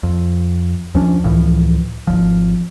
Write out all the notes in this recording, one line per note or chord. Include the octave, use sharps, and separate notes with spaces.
F2
D#2 F3 C#4 D4
C#2 A2 E3 F3
G#1 C#2 F3